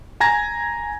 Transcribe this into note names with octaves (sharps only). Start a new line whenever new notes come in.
G#5 A#5 G#6 A#6